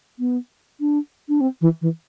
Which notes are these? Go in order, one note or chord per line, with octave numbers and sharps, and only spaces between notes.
B3
D4
D4
C4
E3
E3